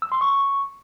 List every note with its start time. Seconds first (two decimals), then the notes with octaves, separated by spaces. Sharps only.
0.02 E6
0.12 C6
0.21 C#6